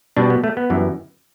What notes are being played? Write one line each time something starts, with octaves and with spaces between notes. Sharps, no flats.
B2 G3 D4
B3
A3
B3
F#2 E3 G3